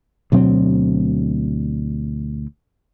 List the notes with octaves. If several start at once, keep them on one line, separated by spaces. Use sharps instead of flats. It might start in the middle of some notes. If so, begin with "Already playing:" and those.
D2 B2 F#3 C4